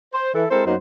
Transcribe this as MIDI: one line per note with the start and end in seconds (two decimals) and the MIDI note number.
0.13 0.30 72
0.34 0.45 52
0.34 0.45 64
0.34 0.45 69
0.50 0.66 56
0.50 0.66 60
0.50 0.66 64
0.50 0.66 69
0.50 0.66 70
0.50 0.66 72
0.66 0.75 42
0.66 0.75 54
0.66 0.75 58
0.66 0.75 59
0.66 0.75 63
0.66 0.75 72